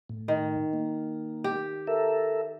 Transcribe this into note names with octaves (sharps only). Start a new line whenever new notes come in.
A2
D#3
A#3
G4
A4 A#4 E5